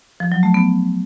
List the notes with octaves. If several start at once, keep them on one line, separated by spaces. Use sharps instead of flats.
F3
F#3
A3
B3